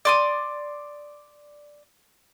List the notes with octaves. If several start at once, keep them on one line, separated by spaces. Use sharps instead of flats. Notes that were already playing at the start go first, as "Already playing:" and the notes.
D5 C6 D#6